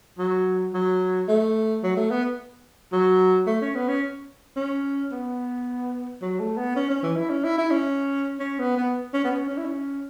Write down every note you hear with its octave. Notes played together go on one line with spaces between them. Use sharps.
F#3
F#3
A3
F#3
A3
B3
F#3
A3
C#4
B3
C#4
C#4
B3
F#3
A3
B3
C#4
C#4
E3
E4
C#4
E4
E4
C#4
C#4
B3
B3
C#4
B3
C#4
C#4
E4
C#4